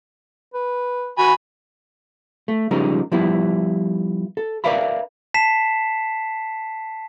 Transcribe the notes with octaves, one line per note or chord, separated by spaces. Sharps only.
B4
F#4 G#5 B5
A3
C#3 F3 G3 G#3 D#4 A#4
F3 G3 B3 E4
A4
A#4 B4 D5 E5 F5 B5
A5 B6 C7 E7